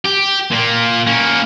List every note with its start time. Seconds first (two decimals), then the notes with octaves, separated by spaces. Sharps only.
0.06 G4
0.52 A#2 A#3
1.07 A#3 C#4